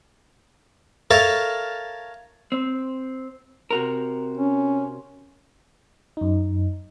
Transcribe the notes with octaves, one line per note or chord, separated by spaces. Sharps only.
A4 A#4 C#5 E5 F5 A5
C4
C3 F#4 A#4
C#4
F#2 D#4